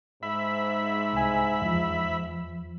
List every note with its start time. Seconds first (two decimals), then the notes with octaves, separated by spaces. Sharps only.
0.23 G#2 E5 B5
1.13 C2 G#5
1.62 E2 F3